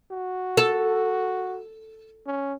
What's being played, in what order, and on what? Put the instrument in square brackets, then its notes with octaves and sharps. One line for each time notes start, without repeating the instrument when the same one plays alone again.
[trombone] F#4
[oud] A4
[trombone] C#4